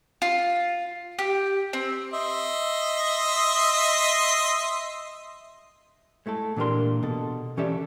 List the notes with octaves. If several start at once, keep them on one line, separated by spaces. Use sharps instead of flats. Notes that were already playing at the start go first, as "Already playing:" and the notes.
F4
G4
C4
D#5 E5 C6
G#3 A3 E4 A4
A#2 E3 D4 G4 A#4 C6
B2 A4
E3 C#4 G4 A4 D5 E5